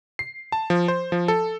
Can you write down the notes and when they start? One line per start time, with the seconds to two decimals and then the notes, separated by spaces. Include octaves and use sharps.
0.19 C7
0.52 A5
0.70 F3
0.88 C5
1.12 F3
1.28 A4